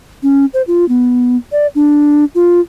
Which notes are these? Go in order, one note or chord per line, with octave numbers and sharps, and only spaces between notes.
C#4
C5
F4
B3
D5
D4
F4